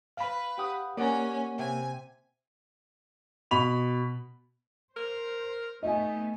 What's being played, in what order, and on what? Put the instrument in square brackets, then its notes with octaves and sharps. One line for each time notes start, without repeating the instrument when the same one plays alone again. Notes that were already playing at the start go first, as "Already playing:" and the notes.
[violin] B4 [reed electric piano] F5 B5
[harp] G4 F#5 D#6
[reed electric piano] A#3 [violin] C#4 G#5 [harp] D5 F#5 A#5
[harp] C3 E5 [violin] G#5
[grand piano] B2 B5 F7
[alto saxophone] A#4 [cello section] C5
[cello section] A3 B3 [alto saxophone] D#4 [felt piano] D#5 E5 G#5